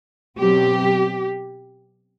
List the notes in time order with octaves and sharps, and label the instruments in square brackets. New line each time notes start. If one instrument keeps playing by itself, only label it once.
[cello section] B2 F#3 C4 G4